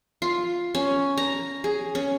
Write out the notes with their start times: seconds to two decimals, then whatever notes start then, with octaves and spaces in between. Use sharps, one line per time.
0.22 F4
0.75 C#4
1.18 A#5
1.64 G#4
1.95 C#4